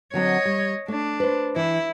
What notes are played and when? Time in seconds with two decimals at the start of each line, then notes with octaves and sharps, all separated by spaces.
0.14 D3 F#3 C4 C#5 D#5
0.45 G3
0.88 A3 D4
1.20 B4 C5
1.56 E3 E4